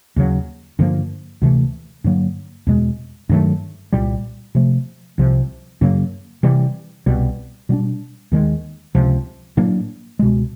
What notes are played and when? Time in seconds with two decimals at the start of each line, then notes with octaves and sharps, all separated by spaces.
0.16 D#2 C#3 F#3
0.79 G2 D3 F3 A#3
1.42 D2 C3 E3 A3
2.04 G2 D3 F#3 A#3
2.67 E2 B2 G#3
3.29 G2 D#3 F#3 A3
3.93 C2 A#2 G3
4.55 C3 F3 A3
5.18 C2 C3 F3
5.81 F#2 C#3 F#3 A#3
6.43 C3 E3 G3
7.06 C2 B2 G3
7.69 B2 G3 B3 D4
8.32 D#2 D#3 G#3
8.95 C#2 C3 F3
9.57 A2 F#3 A#3 D4
10.19 C#2 B2 G#3